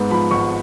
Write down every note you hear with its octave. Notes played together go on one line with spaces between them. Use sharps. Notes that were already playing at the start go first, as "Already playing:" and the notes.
Already playing: G#2 B3
F3 B5
G#1 C#6